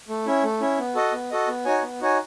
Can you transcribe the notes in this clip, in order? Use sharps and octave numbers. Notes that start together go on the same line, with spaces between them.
A3
C#4 E4
A3
C#4 E4
B3
F#4 A4 D#5
B3
F#4 A4 D#5
B3
D#4 F#4 C#5 G#5
B3
D#4 F#4 C#5 G#5